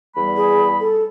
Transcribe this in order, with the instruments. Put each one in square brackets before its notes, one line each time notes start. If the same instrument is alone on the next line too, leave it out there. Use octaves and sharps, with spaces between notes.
[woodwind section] E2 G3 B5
[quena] G#4
A4